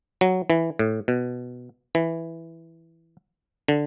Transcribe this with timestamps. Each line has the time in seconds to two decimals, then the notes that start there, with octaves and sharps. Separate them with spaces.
0.21 F#3
0.50 E3
0.79 A2
1.08 B2
1.95 E3
3.68 D3